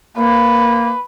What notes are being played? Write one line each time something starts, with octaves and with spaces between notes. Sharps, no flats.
A#3 B4